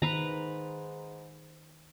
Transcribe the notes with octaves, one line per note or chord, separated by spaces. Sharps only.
G#2 D#3 B4 A#5